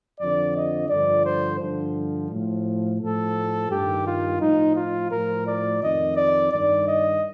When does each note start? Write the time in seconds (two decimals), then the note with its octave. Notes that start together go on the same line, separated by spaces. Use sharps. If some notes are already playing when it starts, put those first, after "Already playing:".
0.19 F2 D3 F3 D5
0.55 D#5
0.89 G2 D3 F3 D5
1.24 C5
1.60 G2 D3 F3
2.30 A2 F3
3.00 A2 F3 A4
3.70 G2 D#3 G4
4.06 F4
4.40 A2 F3 D#4
4.76 F4
5.10 A2 F3 A#4
5.46 D5
5.81 F2 D#3 D#5
6.16 D5
6.51 G2 D#3 D5
6.87 D#5